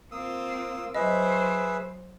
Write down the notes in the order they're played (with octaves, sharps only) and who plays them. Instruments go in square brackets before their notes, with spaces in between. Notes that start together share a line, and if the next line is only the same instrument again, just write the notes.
[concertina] A#3 D#6 E6 [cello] C4 F4
[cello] F#3 C5 [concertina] G#4 B4 E5 [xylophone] D#5